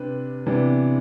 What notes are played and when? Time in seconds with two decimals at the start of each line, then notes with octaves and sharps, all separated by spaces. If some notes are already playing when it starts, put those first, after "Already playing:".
Already playing: C3 D4 B4
0.46 C3 E3 B3 D4